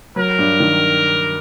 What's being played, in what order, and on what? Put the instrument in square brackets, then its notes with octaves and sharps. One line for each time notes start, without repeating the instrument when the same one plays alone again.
[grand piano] F#3 [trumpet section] A#4
[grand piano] G2
D#3